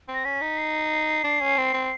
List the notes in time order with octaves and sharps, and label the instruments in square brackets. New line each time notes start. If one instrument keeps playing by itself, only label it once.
[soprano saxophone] C4
[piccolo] A#6
[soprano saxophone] C#4 [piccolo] B6
[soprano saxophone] D#4
[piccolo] C7
[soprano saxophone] D4
C#4
C4
C4